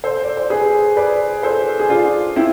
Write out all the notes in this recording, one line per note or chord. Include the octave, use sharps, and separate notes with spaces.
A4 C5
D5
C5
G#4 B4
B4 D5
A4 C5
G#4
D4 F4
C4 E4